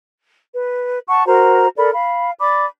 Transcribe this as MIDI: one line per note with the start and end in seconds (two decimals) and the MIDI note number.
0.54 1.01 71
1.09 1.25 78
1.09 1.25 81
1.09 1.25 85
1.26 1.68 66
1.26 1.68 70
1.26 1.68 72
1.26 1.68 82
1.77 1.90 69
1.77 1.90 70
1.77 1.90 74
1.77 1.90 83
1.92 2.30 77
1.92 2.30 83
2.39 2.66 74
2.39 2.66 83
2.39 2.66 86